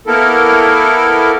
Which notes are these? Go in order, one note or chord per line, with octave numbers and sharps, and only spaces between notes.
A#3 B3 E4 A4 A#4